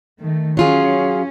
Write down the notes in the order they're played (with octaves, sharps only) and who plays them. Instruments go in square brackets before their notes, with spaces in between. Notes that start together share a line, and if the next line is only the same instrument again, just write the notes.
[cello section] D#3 A3
[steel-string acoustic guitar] F#3 F4 G#4 [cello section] C#4